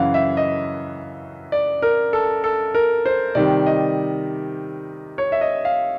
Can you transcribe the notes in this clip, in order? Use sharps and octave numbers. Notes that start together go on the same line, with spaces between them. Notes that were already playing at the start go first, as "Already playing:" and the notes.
Already playing: F#2 C#3 E3 F5 F#5
E5
D#5
D5
A#4
A4
A4
A#4
C5
C3 D#3 G3 D5
D#5
C#5
E5
D#5
F5